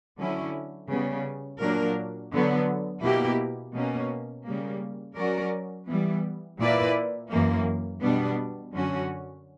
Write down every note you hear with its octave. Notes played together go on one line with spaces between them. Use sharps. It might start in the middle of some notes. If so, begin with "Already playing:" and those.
D3 F#3 C#4 E4
C#3 G3 B3
A#2 F#3 A#3 D4 A#4
D3 F#3 B3
B2 A#3 E4 G4
B2 A#3 C#4
C#3 G3 A#3
F#3 C#4 F#4 A#4 D5
E3 G3 B3
A#2 A#3 E4 B4 D5
F#2 E3 A#3
B2 G3 B3 D4
F#2 D3 F#3 C#4 F#4